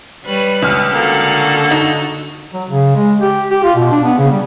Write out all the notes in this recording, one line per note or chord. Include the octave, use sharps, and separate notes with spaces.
G3 B4 C#5
C#2 F6
D3 A#3 F#4 A4
D#4
F#3
C#3
G#3
G4
G4
F4
B2
D4
B3
C#3
G3